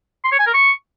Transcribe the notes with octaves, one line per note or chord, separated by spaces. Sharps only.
C6
C#5
G#5
A#4
C#6